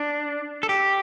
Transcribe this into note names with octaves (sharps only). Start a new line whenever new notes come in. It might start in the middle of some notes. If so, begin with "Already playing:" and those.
Already playing: D4
A4
G4